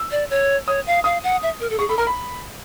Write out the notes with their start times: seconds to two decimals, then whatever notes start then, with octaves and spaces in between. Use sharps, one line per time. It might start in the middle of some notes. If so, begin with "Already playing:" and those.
Already playing: E6
0.11 D5
0.30 C#5
0.67 C#5 D#6
0.87 F5
1.04 F5 D#6
1.23 F#5
1.43 E5
1.60 A#4
1.70 A4
1.79 G#4 C#6
1.89 A4 B5
1.97 A#4 A#5
2.07 B5